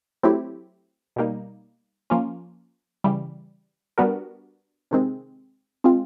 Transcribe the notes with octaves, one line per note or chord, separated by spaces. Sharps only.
F#3 A3 C4 E4 G4
B2 G3 A#3 D#4
F3 A#3 C#4 F4
C#3 E3 G3
G3 B3 D4 F#4 A#4
C3 D#3 G#3 C4
G#3 C4 F4